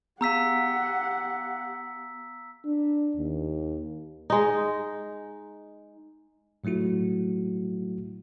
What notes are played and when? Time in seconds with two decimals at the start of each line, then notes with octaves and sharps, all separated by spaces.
0.21 B3 G4 F5 F#5 A#5 E6 B6
2.65 D4
3.17 D#2
4.30 G#3 D#4
6.64 A2 F#3 A3 E4 F#4